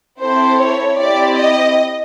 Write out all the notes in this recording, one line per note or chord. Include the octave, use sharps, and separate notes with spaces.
C4 E4 A4 C5
C#5
C4 E4 G4 D5
D#5